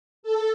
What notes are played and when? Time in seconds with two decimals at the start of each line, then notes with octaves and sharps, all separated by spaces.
0.23 A4